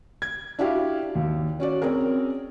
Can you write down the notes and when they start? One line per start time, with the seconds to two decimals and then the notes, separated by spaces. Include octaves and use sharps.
0.22 G#6
0.59 D4 E4 F#4 G4 F5
1.15 D#2
1.60 C#4 F#4 D5
1.82 C4 C#4 G#4 A#4